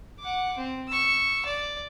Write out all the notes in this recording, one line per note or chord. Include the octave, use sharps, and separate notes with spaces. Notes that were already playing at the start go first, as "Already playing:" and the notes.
F#5 D6
C4
C#6 E6
D5